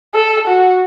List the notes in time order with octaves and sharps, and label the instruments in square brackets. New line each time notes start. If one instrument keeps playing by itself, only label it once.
[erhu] A4
F#4